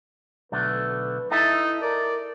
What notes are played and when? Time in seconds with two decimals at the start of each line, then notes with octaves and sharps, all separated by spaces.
0.52 B1 D3 A3 B4
1.31 D#4 E4 A4 E5
1.82 A#4 D5